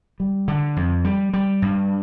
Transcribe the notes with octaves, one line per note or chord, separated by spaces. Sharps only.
G3
D3
F2
G3
G3
G2